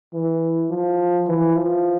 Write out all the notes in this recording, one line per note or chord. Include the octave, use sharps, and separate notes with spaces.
E3
F3
E3
F3